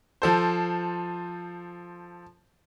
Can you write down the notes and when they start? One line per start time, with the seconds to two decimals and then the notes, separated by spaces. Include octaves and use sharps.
0.22 F3 A4 C5